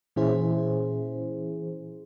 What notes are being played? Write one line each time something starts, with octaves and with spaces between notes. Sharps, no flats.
A#2 E3 C#4 E4 G#4 C5